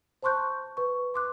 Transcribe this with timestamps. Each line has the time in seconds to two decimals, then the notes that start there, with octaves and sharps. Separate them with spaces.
0.23 C5 A5 C6 C#6 F#6 G6
0.77 B4 C#6
1.14 C6 D6 F#6